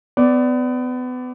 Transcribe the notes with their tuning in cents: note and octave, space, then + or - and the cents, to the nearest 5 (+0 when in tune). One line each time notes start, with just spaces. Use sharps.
B3 +30 D5 -5